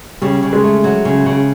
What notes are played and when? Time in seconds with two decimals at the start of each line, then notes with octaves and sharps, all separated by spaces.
0.21 C#3 G3
0.43 C#3
0.53 G#3
0.63 A3
0.84 F#3
1.05 C#3
1.26 C#3